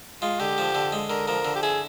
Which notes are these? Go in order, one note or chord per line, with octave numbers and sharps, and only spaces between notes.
G#3 F4
D3 G4
F3
D3
G#3
D3 A#4
F3 A#4
D3
G4
E4 G#4